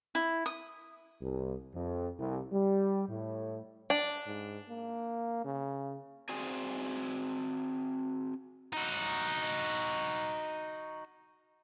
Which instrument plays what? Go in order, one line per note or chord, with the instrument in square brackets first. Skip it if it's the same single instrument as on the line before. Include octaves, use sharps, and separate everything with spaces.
[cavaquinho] E4
D#6
[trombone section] C2
F2
C2
G3
A2
[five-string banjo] D4
[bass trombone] G#2
A#3
C#3
[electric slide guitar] C4 F#4 G#4 C5 D5 G#5
[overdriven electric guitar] D#4 F#4